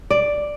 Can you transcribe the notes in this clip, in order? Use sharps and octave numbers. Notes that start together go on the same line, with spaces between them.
D5